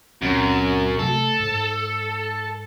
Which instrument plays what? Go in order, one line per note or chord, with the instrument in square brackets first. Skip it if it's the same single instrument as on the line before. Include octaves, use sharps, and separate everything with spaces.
[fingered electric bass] C#2 A#2 C4 [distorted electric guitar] F#2
[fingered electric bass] C3 A3 [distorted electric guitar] A4
[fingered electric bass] G#2